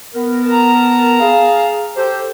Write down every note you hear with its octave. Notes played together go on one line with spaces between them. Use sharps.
B3 A#4
A5 A#5
G#4 F5
G4 A4 C5